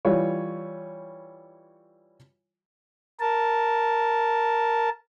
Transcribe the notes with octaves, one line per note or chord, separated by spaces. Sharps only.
E3 G3 F4 C#5
A#4 A5